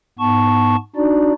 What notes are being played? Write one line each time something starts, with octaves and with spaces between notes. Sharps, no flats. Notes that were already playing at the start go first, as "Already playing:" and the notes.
G#2 B3 A5 C#6
D4 D#4 F#4 D5